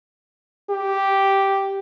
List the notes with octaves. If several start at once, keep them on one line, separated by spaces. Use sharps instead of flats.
G4